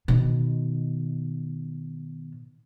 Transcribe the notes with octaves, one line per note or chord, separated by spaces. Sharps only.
B2 D#3